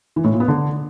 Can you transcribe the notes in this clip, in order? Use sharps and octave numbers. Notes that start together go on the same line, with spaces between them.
E3
A2
A#2
B3
D3